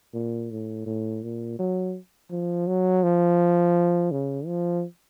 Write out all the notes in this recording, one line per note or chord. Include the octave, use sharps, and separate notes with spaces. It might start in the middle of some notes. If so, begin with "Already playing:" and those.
A#2
A2
A2
A#2
F#3
F3
F#3
F3
C#3
F3